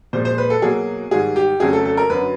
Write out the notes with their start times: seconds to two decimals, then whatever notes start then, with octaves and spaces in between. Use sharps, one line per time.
0.13 A#2 F3 G#3 C5
0.25 C5
0.38 B4
0.50 A4
0.62 B2 F#3 A#3 G#4
1.11 G#2 D#3 G3 G#4
1.36 G4
1.60 F2 C#3 F#3 A3 C#4 G#4
1.73 A4
1.85 A4
1.97 A#4
2.10 F#2 D3 F#3 B4